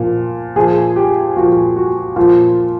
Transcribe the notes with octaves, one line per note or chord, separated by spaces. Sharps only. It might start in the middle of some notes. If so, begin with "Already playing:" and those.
Already playing: A#2 F3
A#2 F3 G#4
G4
A#2 F3 F#4
F#4
A#2 F3 F4